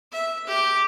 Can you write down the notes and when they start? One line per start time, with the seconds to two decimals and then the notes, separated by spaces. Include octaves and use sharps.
0.11 E5
0.47 G4